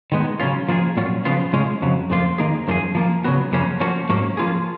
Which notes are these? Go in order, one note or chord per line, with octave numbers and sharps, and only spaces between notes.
D#3 G#3 B3 D#4
C#3 F#3 C#4 F4
F3 A#3 F4 G#4
A#2 F#3 C#4 F4
C#3 F3 B3 F4
C#3 G#3 C#4 F4 G#4
F2 C#3 F#3
F2 F3 A#3 F4
D#3 A#3 D#4 G#4
F#2 F3 A#3 F4 G#4
F3 A#3 F4
C#3 F#3 B3 F#4
F#2 C#3 F3 A#3 C#4
F3 A#3 C#4 F#4
G#2 F#3 A#3 C#4
F3 A#3 F4 G#4